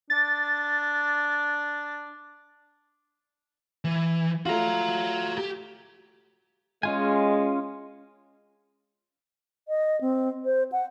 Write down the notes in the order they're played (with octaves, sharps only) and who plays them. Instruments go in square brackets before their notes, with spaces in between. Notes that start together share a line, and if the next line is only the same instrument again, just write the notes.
[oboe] D4 [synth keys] A6
[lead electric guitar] E3
[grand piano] A3 F4 [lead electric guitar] F#4 A#5
[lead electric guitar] G4
[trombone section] G#3 [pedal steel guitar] C#4 F4 G#5
[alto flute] D#5
C4
C5
F#5